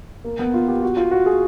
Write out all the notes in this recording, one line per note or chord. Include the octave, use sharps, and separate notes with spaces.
A#3
B3
F4
G4
F#4
F4
F#4
G#4